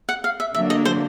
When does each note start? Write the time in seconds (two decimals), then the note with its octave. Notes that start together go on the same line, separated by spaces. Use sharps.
0.09 F#5
0.24 F5
0.40 E5
0.55 D3 F#3 A#3 D4 E5
0.70 D#5
0.85 C5